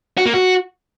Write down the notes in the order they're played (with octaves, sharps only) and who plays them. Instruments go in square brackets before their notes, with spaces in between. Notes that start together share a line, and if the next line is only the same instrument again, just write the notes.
[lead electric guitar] F#4
A#3
F#4